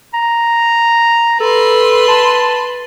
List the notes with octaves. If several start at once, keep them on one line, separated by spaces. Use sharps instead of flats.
A#5
A4 B4 C6
A5